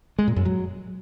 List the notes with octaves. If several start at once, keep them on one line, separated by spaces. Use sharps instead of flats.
G#3
A#2
F#2
F#3